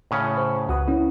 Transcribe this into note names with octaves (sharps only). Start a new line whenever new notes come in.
A2 C#3 C#4
C5
C#2 F#4 B4 D#6
C#4 E4